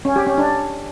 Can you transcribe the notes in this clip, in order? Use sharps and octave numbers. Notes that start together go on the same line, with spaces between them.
C#4
G4
C#4
D4